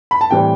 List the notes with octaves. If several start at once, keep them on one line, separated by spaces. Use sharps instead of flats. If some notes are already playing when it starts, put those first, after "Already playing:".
B5
A5
A2 E3 G3 C4 G5